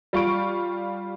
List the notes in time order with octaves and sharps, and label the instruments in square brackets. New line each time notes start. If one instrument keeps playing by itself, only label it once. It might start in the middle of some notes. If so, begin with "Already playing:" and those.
[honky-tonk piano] G3 F4 C#6 D7